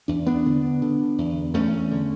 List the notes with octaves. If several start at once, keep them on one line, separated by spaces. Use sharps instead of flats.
E2 D4
B3 D4
D3
D3
E2
E2 A3 C#4
D3